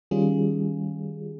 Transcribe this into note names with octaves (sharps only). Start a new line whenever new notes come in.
D#3 G3 C#4 F4 G#4